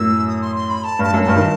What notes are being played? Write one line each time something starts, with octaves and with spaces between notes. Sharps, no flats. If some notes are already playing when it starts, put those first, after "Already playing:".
Already playing: F#2 A2 E6
D#6
C6
C6
B5
A5
G2 A5
F#2
G2 A5
D#3